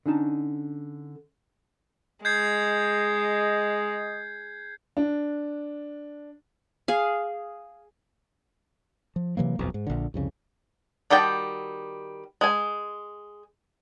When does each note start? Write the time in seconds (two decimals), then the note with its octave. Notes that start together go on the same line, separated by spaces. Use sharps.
0.06 D3 C#4 D#4 A5
2.25 G#3 D#5 G6 G#6 C7
4.97 D4
6.88 G#4 F5
9.16 F3
9.37 C3 E3 F#3 A#3
9.59 D#1 B1 F2
9.74 G#2
9.87 A#1 D3
10.14 C2 F2 C#3
11.10 D#3 G3 F#4 G5 A5
12.41 G#3 G#5